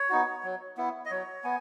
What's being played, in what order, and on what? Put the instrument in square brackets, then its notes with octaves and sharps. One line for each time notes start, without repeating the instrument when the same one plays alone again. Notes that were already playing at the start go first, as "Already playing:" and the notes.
Already playing: [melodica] C#5
B3 D#4 F#4
F#3
B3 E4
D#5
F#3 C#5
B3 G#5